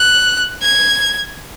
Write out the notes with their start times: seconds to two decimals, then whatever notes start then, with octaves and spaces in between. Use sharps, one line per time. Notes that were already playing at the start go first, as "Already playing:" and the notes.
Already playing: F#6
0.62 G#6